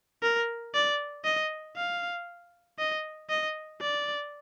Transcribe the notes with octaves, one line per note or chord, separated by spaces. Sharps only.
A#4
D5
D#5
F5
D#5
D#5
D5